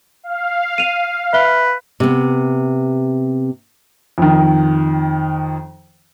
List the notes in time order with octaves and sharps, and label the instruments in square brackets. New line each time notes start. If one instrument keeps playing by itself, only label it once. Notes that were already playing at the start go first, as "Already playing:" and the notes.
[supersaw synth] F5
[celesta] D#7 F7
[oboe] B4 [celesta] E5 G7
[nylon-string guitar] C3 B3
[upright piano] F2 D#3